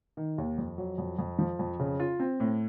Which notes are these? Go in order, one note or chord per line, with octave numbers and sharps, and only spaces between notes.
D#3
D#2
F2
F#3
F2
F2
F3
F2
C#3
F4
C4
A2